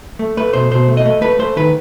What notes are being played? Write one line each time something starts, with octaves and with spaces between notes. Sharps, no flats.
A3
A3 B4
B2 C5
B2 C5
A3
D#5
A3
A3 B4
A3 C5
D#3 B4